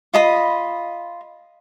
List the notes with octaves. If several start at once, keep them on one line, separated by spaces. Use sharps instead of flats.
F4 D#5 B5